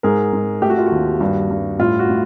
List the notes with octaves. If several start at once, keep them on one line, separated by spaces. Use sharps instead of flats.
G#2 G#4 A#4
G#2
A3 G4
F#4
F4
F#4
D#2
G2
G2
A2 F4
F#4
A2